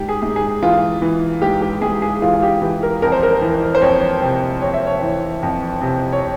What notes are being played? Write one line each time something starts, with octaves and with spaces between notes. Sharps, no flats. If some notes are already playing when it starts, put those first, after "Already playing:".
Already playing: G#2 G4
G#4
G#2
G#4
E3 F4
E3
G#2 G4
G4
G#2 G#4
G#4
E3 F4
F4
G4
E3 G4
A#4
F2 A#4
C5
A#4
E3
C5
F2 C#5
C3
F2 C#5
E5
C#5
E3
F2
C3
C#5